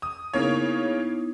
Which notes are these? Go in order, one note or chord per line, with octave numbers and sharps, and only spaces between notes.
D#6
C#3 A#3 B3 D#4 E4 C#5